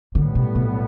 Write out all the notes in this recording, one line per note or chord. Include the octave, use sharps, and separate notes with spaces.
B1 A2 D3 G3 B3
B2
B2